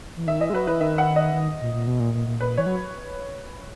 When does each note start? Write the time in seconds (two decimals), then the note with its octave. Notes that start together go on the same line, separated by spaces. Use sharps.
0.16 E3
0.27 D#3 E5
0.40 E3 D#5
0.50 G#3
0.53 F#3 B4
0.67 E3 B4
0.80 D#3 E5
0.98 F#5
1.16 D#5
1.33 D#3
1.61 A#2
1.73 A#2
1.87 B2
2.00 A#2
2.14 A#2
2.27 A#2
2.40 A#2 B4
2.57 E3 C#5
2.66 F#3